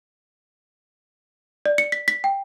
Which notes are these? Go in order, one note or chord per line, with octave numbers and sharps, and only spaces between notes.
D5
C#7
B6
B6
G5